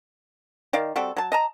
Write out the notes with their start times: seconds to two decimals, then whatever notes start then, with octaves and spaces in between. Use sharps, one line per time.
0.73 D#3 D5 F5
0.96 G3 C4 F#4 A4
1.17 F#3 A5
1.32 D#5 A5 A#5